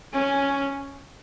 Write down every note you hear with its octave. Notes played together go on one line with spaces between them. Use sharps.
C#4